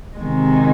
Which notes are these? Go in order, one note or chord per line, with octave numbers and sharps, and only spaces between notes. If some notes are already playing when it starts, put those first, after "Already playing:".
C3 D#3 G#3